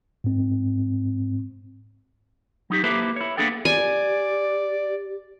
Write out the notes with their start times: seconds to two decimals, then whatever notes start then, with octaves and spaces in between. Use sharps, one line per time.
0.24 G#2 C4
2.70 F#3 D#4 G4
2.84 A#3 E4 G4 A4 B4 C5
3.16 E4 C#5
3.37 A#3 B3 D4 G#4 A4 G5
3.65 G4 D5 G#5